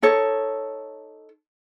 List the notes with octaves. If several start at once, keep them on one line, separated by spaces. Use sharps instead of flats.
D#4 A4 C#5